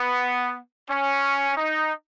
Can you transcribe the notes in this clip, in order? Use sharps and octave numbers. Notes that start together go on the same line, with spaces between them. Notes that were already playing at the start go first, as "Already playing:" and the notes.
Already playing: B3
C#4
D#4